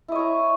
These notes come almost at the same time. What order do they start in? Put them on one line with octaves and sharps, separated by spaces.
E4 D#5 C#5 A#5